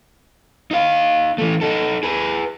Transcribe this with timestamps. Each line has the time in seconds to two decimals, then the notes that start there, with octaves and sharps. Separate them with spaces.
0.71 D#4 F5
1.38 E3 A3
1.61 D#4 A4
2.03 G#4 B4